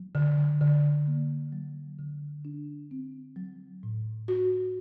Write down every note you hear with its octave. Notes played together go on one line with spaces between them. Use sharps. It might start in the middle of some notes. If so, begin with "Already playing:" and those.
Already playing: F#3
D3
D3
A#3
F#3
D3
D4
C4
F#3
A2
F#4